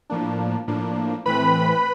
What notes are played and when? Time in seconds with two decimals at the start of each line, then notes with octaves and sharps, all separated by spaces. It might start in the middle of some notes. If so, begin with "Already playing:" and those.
0.10 A2 F3 A#3 D4
0.68 A2 F3 A#3 D4
1.25 A2 E3 A3 C4 B4 B5